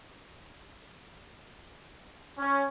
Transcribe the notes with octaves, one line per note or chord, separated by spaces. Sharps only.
C#4